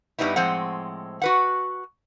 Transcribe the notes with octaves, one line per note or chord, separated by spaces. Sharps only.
G2 G3 B3 D#4 E4
A2 F3 G#3 C4 F#5
F#4 B4 F#5